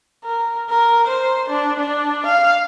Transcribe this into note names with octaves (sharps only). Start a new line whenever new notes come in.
A#4
A#4
C5
D4
D4
F5